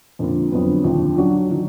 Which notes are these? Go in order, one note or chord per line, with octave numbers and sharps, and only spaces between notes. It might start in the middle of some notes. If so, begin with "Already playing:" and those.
F2 D3 F3 A#3 F4
F2 D3 F#3 B3 F4
D#2 D3 F3
F#3 D4 F#4
D#3 F#3